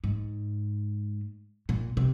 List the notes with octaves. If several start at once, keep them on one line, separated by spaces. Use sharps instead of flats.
G#2
A#2
C3